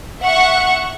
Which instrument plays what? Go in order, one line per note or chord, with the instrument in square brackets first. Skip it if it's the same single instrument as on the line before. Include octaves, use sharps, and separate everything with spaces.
[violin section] E5 F#5 C#6